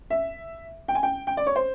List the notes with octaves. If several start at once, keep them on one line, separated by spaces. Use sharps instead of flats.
E5
G5
G#5
G5
G5
D5
C#5
C5